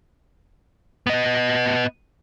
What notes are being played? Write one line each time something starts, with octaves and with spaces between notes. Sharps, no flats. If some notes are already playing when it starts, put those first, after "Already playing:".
B3 D#5